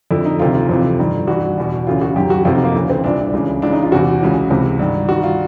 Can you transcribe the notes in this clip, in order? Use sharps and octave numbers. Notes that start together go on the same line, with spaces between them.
F2 D3 E4
D#4
D2 C3 D#3 F4
F4
F2 C3 E3
G2 D#3
G2 E3 F#4
E2 B2
D2 C#3 E3 F4
F#4
F#2 D#3 G4
F#4
F2 C3 E3 F4
D#4
A#3
D2 C#3 E3
C4
C2 A#2 D4
C#2 C#3 E3
C#2 C#3 E3 D4
D#4
F4
E2 C3 E3 F#4
C#2 C#3 E3
C#2 C3 E3
G2 D#3
G2 D#3 F#4
F4